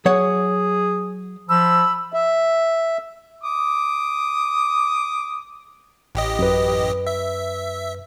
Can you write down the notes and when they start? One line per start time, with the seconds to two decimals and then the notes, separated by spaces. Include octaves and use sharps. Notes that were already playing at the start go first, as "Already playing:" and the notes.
0.05 F#3 G#4 C#5 F#5
1.49 F3 B5 E6
2.13 E5
3.44 D6 D#6
6.15 A1 G4 D#5
6.39 F#2 B4
7.07 E5